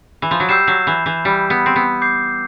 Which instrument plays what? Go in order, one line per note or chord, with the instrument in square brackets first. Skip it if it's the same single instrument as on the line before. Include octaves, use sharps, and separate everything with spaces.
[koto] E3
F3
F#3
[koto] G3 [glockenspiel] E6 G6 C7 E7
[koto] F#3
E3
E3
G3
B3
C4
B3
[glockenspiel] D6 G6 C7